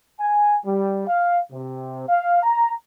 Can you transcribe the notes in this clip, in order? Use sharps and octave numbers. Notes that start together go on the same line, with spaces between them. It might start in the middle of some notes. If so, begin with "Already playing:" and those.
G#5
G3
F5
C3
F5
A#5